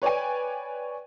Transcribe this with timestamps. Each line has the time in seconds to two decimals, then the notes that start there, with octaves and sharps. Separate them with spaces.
0.02 B4 C#5 D5 G5 G#5